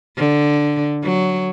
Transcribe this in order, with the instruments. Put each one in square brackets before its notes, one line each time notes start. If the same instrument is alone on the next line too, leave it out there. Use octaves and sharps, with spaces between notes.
[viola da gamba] D3
F#3